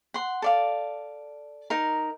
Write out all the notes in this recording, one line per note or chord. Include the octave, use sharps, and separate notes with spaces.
F#5 C6
A4 D5 F5
D#4 A#4